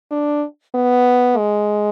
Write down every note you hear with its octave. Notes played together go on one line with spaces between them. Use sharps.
D4
B3
G#3